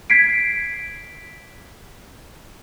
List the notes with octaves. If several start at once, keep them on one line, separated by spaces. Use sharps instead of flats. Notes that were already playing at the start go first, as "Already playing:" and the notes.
G#6 B6 C7 D7